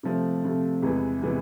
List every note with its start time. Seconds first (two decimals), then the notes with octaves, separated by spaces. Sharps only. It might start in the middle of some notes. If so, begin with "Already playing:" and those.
0.03 C3 F3 A3
0.43 C3 F3 A3
0.82 E2 C3 E3 G#3 B3
1.22 C3 E3 G#3 B3